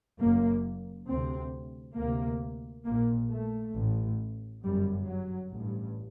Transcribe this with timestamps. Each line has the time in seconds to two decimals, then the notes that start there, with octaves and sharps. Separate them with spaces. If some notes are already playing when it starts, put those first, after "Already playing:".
0.18 F#1 F#2 A#3
1.07 D2 C3 C4
1.96 D2 C3 A#3
2.85 A#1 A#2 A#3
3.30 A3
3.74 A1 A2
4.63 G1 F#2 G3
5.07 F#3
5.51 A1 G2